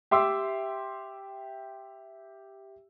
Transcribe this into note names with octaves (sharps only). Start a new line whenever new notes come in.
G4 E5 C6 D6 E6